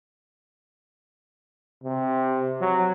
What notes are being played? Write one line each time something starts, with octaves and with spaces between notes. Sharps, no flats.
C3
F#3